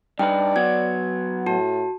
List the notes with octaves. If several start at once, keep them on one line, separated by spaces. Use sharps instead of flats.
G2 D#4 B4 D5 G5
F#3 B3 G#6
A2 F#4 A5